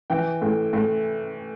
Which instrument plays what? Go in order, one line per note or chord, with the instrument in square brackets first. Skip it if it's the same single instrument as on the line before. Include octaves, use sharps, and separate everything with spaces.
[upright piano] E3 G5
A2
A2